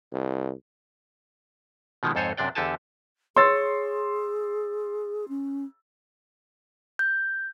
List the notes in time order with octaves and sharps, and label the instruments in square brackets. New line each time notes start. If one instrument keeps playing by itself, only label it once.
[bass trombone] C2
[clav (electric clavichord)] B2 D#3 F3 G#3
F2 G#2 A4 C5 C#5 G#5
F#2 C3 D4 D5 G5
E2 D3 G4 A4 G#5 A5
[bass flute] G#4 [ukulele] C#5 [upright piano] C6 E6 A6
[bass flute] C#4
[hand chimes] G6